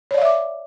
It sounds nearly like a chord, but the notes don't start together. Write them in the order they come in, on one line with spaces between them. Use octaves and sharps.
C#5 D5 F5 E5 D6